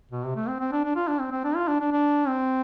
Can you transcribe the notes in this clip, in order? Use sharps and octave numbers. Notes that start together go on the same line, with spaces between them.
B2
C3
A3
C4
C4
D4
D4
F4
D4
C4
C4
D4
F4
D4
D4
D4
C4